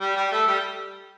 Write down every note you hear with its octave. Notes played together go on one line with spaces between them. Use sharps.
G3 G4
G3 G4
A3 A4
G3 G4